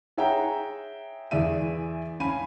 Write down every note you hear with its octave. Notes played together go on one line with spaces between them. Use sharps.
G#4 C#5 E5 F#5 G5 A#5
E2 E3 G#4 D5 E5 D#7
C#4 F5 G#5 B5 D#7